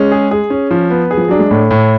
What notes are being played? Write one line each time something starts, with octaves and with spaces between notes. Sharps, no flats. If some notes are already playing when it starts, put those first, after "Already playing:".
Already playing: G#3 C#4
G#4
G#4
C#4
F3
B3
G#4
F3
F#3 D4
G#3
A2 A3
A2